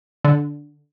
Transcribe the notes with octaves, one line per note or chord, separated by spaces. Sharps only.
D3